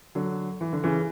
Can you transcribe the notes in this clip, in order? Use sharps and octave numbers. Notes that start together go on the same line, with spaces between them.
D3 F#3
E3
D3
C#3 E3